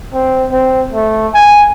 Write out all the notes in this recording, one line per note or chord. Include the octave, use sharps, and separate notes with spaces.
C4
C4
A3
G#5